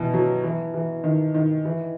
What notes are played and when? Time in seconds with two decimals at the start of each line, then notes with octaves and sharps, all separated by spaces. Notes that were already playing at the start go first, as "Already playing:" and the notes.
Already playing: B2 E3
0.14 F#3
0.43 E3
0.74 E3
1.04 D#3
1.35 D#3
1.65 E3